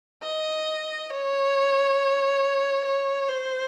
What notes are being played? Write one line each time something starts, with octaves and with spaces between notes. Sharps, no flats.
D#5
C#5
C#5
C5